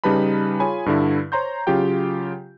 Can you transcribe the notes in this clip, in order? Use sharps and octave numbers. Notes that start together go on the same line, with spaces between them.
C#3 G3 D#4 B4 A5 B5
F4 G#4 C#5 G#5 B5
G2 D3 E4
C5 C#5 A#5 C6 G6
C#3 F#3 F4 G4 G5